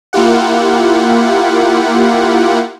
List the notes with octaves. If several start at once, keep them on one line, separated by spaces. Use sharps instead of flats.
A#3 E4 F4 G4 F#5